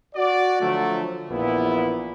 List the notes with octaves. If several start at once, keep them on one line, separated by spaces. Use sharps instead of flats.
F#4 D5
D3 F3 F#3 A3
A#1 E2 A#2 B3 E4